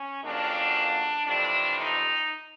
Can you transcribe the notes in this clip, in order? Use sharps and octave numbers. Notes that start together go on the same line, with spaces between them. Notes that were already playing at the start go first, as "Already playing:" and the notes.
Already playing: C#4
F2 C#3 F#3 A#3 D4
F2 C3 E3 A3 D4
D#4